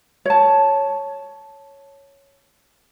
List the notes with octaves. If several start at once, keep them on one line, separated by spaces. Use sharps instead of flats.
C#5 A5